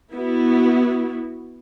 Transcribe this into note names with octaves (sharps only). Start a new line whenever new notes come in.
B3 E4 F#4